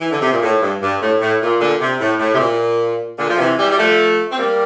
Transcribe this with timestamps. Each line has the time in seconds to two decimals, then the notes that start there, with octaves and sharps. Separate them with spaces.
0.01 E3
0.11 D3
0.21 C3
0.32 A#2
0.43 A2
0.62 G2
0.82 G2
1.01 A2
1.21 A2
1.42 A#2
1.60 A#2 D3
1.81 C3
2.00 A2
2.20 A2
2.34 C3
2.40 A#2
3.19 A#2 D3
3.30 F3
3.38 C3 E3
3.58 E3 G3
3.71 G3
3.78 F3 A3
4.32 C4
4.38 G3 A#3